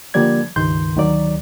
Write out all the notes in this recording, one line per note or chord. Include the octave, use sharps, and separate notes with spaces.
D3 F3 G3 A#3 D5 G#6
C#2 G2 D#3 C6 G6
D2 D#3 F#3 D5